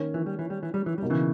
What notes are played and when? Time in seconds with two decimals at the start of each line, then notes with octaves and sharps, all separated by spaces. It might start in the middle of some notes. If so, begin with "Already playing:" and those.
Already playing: D#3 A#3 C#4
0.14 E3
0.26 G3
0.39 E3
0.50 G3
0.63 E3
0.74 G3
0.86 E3
0.98 B2 G3 A#3 D#4
1.10 C#3 E3